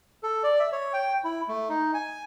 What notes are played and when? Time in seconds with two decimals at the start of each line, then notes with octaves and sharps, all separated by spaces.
0.23 A4
0.43 D5
0.60 E5
0.72 C#5
0.93 G5
1.24 E4
1.48 A3
1.69 D#4
1.94 G#5